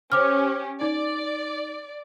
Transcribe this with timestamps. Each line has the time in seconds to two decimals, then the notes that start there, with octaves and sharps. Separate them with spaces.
0.12 C#4 G4 C5 D6 F6
0.81 D#4 D5